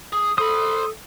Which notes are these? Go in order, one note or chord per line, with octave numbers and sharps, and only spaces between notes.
G#4 D#6
A4 C5 B5 D#6